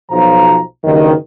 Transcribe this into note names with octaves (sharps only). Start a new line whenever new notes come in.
B1 F3 A#5
F#1 G2 D#3